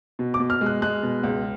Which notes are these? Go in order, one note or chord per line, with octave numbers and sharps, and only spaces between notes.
B2
D6
B2
F6
G#3 F#6
G#3 F#6
B2
C#2